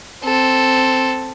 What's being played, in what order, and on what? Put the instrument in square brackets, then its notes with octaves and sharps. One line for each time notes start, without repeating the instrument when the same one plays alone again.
[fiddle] C4 A4